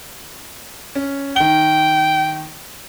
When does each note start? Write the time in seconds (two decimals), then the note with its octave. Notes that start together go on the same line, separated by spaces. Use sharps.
0.95 C#4
1.36 D#3 G5 G7